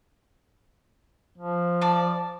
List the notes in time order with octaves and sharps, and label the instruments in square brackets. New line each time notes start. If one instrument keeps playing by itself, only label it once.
[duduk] F3
[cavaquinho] D5 A5